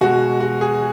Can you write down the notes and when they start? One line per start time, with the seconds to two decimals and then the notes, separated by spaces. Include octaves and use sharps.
0.01 B2 G#3 F#4
0.41 F#4
0.61 G#4